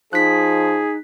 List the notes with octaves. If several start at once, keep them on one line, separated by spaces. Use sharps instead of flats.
F3 D#4 G#4 F#6 B6